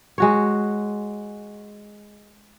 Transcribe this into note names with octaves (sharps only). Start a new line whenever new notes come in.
G#3 F#4 C#5